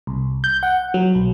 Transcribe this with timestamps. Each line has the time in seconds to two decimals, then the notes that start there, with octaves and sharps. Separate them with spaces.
0.07 C2
0.44 G6
0.63 F#5
0.94 F#3
1.15 B1